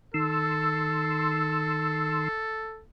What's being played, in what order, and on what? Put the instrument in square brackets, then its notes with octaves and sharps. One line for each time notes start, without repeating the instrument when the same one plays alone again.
[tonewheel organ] D#3 C6 E6 [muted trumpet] A4